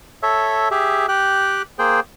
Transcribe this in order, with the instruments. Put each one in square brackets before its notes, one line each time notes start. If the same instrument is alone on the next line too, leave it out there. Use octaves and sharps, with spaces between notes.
[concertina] A4 C#5 E5
G4 G#4 E5
G4 G5 F#6
A#3 G#4 C5 G5